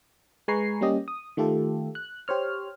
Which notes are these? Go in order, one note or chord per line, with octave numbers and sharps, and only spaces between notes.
G#3 B4 G#5 A#5 C#6 C7
G3 A#3 C#4 G4 D#5
D#6
D#3 A3 F4 G4 A4
F#6
G4 C5 C#5 F6